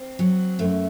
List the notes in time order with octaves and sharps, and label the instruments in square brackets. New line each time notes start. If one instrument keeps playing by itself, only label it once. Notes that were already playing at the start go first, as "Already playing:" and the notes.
Already playing: [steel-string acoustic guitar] C4
F#3
F#2 A3